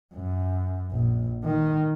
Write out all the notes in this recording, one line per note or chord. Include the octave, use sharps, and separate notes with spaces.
F#2
A#1
D#3